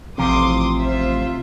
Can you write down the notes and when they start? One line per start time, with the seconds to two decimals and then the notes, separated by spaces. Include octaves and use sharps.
0.18 A1 C3 F3 C6 D6 D#6
0.78 F4 C5 E5